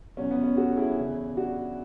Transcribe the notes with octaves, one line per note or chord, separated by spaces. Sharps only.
E2 B2 F#3 C#4
B3
C#4
F#4 A4
E4 G#4
E2 C#3 E3
D4 F#4